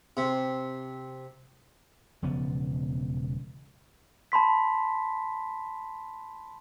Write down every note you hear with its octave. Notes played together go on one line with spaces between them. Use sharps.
C3
E1 C#3 F3 B3
A5 B5 C6 B6